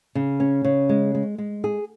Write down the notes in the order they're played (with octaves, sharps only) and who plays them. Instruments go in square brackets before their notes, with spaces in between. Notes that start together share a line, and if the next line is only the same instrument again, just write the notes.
[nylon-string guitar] C#3
C#4
C#3
G#3
G#3
G#3
G#4